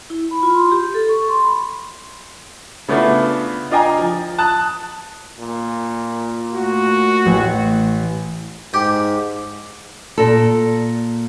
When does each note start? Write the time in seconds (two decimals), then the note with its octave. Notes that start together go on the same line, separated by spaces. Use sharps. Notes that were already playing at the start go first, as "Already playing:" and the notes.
0.10 E4
0.31 B5
0.43 F4
0.54 C6
0.71 G4
0.94 A4
1.09 C#6
1.29 C6
1.41 B5
2.88 C#3 A3 B3 D4 E4 F4
3.71 D4 F4 D#5 G5 G#5 A#5
3.99 F3
4.38 A5 D#6 F#6
5.39 A#2
6.54 A3 F#4
7.26 A1
8.74 G#2 G4
10.18 A#2 A4